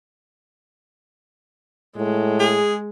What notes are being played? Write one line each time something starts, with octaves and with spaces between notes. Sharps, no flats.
A2 G#3
G#4